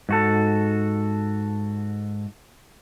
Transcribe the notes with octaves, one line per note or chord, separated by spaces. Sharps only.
G#2 F#4 A4